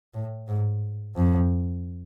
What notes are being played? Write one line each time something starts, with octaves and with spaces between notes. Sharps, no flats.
A2
G#2
F2